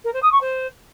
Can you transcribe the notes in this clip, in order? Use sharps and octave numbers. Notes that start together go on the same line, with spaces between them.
A#4
C5
D#6
C#6
C5